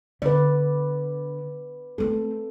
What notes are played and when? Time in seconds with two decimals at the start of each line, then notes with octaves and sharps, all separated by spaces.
0.22 D3 B4 D5
1.98 A3 C4 A4